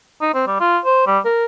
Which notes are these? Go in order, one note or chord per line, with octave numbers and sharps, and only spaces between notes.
D#4
C4
G3
F4
C5
G3
A#4